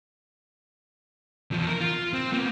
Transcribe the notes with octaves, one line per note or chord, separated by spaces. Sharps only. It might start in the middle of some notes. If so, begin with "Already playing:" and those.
E2 F3
A#4
F4
C4
A#3 B3